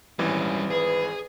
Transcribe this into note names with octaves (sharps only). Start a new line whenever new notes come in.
G#1 E3 G3 C#4
G#4 B4